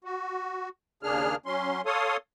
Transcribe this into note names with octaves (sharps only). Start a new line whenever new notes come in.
F#4
D#2 C#3 A#3 D4 G#4 F6
F#3 C#4 C6
A4 C#5 F5 C6 D#6